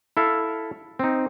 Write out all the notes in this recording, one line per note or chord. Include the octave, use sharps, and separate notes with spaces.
E4 A4 E5 F5
C4 D#4